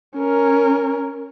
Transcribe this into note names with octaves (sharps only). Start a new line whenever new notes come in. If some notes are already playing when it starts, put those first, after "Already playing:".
C#4 A#4